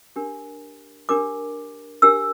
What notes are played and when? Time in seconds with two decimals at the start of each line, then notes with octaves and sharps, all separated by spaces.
0.16 D4 G4 A#4
1.09 D4 G4 A#4 D6
2.02 D4 G4 A#4 E6